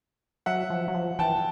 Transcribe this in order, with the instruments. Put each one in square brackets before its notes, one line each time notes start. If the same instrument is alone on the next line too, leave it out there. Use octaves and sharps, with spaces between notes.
[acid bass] F#3 [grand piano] E5 F#5
[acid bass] F3
F#3
F3
[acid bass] E3 [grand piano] G5 A5